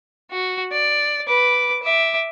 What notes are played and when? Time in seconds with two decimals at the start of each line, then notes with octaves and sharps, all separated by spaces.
0.31 F#4
0.72 D5
1.28 B4 D6
1.83 E5 D6